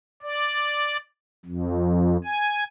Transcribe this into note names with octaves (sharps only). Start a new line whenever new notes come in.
D5
F2
G#5